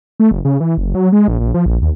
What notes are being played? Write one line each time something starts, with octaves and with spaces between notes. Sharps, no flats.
A3
F#1
C#3
E3
F#1
F#3
G#3
A#1
A#1
F3
A#1
D#2